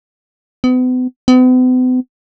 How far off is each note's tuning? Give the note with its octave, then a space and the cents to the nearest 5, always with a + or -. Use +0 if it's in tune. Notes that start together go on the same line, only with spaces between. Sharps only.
B3 +40
B3 +45